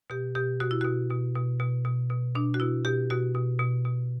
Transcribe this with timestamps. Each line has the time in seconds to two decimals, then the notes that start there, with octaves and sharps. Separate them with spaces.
0.10 B2 G4
0.35 B2 G4
0.60 B2 F#4
0.71 E4
0.81 B2 F#4
1.10 B2
1.35 B2
1.60 B2
1.85 B2
2.10 B2
2.35 B2 D4
2.54 F#4
2.60 B2 E4
2.85 B2 G4
3.10 B2 F#4
3.35 B2
3.60 B2
3.85 B2